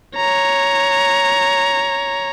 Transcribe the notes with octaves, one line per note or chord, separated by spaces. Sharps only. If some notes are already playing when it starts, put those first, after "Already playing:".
C#5 A#5